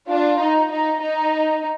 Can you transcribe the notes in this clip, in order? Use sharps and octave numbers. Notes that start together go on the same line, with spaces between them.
D4 F4
D#4
D#4
D#4